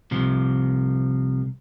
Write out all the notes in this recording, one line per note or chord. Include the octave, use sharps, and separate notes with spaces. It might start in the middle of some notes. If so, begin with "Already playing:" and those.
C2 C3 F3